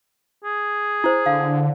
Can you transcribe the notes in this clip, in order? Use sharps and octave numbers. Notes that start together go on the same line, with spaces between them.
G#4
E4 C5
D3 F5